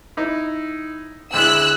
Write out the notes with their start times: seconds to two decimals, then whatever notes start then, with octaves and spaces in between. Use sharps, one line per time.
0.17 D#4 E4
1.33 D2 G#3 E4 E6 F#6